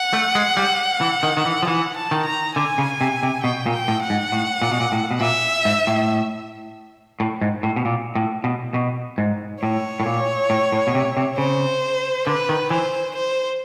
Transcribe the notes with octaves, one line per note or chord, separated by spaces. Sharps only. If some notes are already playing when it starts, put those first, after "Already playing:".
Already playing: F#5
A3
G#3
G3
E3
D#3
D#3
E3
F3
E3 F#5
A5
D#3
A#5
D3 G#5
C#3
C3
C3
B2 G5
A#2
G5
A2
F#5
G#2
A2
A#2
B2
A#2
A2
B2
A#2 E5
G#2
A2
A2
G#2
A2
B2
A#2
A2
B2
B2
G#2
A2 C#5
A2
A#2
A2
A2
B2
C3
C3
C#3 C5
D3 B4
D#3
E3 C5
C5